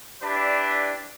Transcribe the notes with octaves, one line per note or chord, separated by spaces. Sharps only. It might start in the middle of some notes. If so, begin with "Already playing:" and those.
D4 E4 G4 B4 D5